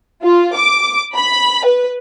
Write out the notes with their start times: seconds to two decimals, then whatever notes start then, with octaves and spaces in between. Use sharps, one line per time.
0.24 F4
0.55 D6
1.15 B5
1.65 B4